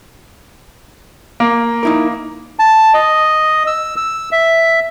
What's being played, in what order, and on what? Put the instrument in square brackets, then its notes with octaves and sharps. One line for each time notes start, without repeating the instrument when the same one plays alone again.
[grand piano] A#3
[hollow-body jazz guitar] D#4 E4 A#4
[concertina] A5
D#5
E6
E6
E5